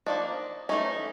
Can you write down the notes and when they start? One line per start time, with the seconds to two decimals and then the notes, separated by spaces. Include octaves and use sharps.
0.06 F3 A#3 D4 D#4
0.69 E3 A3 C#4 D#4